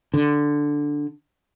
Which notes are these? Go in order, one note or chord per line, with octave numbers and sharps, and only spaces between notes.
D3